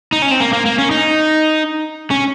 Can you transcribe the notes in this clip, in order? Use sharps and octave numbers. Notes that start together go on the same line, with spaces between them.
D#4
C#4
C4
A#3
A#3
A#3
C#4
D#4
C#4